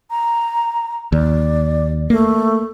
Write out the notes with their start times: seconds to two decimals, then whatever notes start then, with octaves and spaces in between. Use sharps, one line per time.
0.10 A#5
1.12 D#2 D5
2.10 A3 A#3